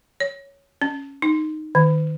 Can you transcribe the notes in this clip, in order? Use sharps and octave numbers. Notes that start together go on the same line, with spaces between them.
C#5
C#4
D#4
D#3